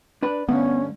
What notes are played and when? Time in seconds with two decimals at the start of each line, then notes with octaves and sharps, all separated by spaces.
0.23 D4 B4
0.49 D2 G2 D3 B3 C#4